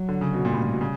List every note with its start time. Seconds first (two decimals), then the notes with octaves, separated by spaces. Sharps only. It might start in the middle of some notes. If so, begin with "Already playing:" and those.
Already playing: F#3
0.09 D3
0.21 C#3
0.33 B2
0.45 A#2 G3
0.54 A2
0.62 A#2
0.72 B2
0.81 C#3